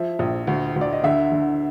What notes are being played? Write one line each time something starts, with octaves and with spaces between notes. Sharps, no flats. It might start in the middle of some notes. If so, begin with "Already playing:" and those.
Already playing: F3 E5
A#1
D2
D2
D5
D#5
D3 E5
D3